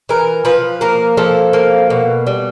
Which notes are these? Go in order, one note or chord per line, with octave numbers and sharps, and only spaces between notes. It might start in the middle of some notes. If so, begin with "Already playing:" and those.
E3 A#4
F3 B4
A#3 A#4
F3 A4
A#3
B2
G3